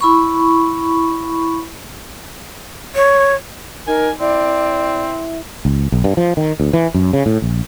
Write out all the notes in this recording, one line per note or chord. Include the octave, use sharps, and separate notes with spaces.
E4 B5 C#6
C#5
D#4 A#4 G#5
C4 E4 D5
C#2
B1
G2
F3
D#3
D2
E3
F#2
C#3
A2
A#1